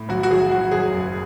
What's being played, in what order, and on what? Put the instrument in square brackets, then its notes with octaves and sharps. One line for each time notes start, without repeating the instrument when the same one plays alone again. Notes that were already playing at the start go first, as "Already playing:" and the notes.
Already playing: [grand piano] A2
B1 F#4
F#4
B1 G#4
B1 F#4
F#2 G#4
F#1